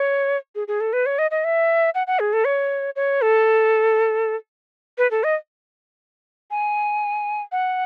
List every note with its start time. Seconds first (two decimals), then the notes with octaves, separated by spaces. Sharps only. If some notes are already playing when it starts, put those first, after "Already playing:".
Already playing: C#5
0.55 G#4
0.68 G#4
0.81 A4
0.93 B4
1.06 C#5
1.19 D#5
1.31 D#5
1.44 E5
1.95 F#5
2.07 F#5
2.19 G#4
2.33 A4
2.45 C#5
2.96 C#5
3.22 A4
4.98 B4
5.11 A4
5.24 D#5
6.51 G#5
7.52 F#5